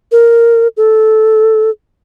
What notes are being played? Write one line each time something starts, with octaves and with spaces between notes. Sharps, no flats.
A#4
A4